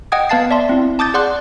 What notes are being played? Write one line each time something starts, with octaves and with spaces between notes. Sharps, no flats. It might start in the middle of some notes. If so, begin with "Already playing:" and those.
D#5 F#5 G5 D#6 G#6
B3 B4 F5 A5 A6 C7
D5 E5 A5 C6
C4 E4
A5 D6 D#6 G6 A6
G#4 D5 F#5 C6 F#6